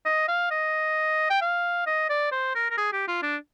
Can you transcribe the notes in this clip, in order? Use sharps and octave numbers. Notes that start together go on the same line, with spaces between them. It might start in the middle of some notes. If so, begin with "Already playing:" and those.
D#5
F5
D#5
G5
F5
D#5
D5
C5
A#4
A#4
G#4
G4
F4
D4